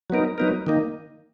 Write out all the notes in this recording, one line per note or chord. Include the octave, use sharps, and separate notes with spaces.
F#3 B3 D#4 A#4
F#3 B3 D#4 A#4
D#3 A#3 D#4